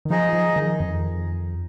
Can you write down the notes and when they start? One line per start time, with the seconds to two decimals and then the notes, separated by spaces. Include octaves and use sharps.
0.05 D#3
0.10 F3 D#4 G#4 D#5
0.33 F3
0.56 D#3
0.80 F2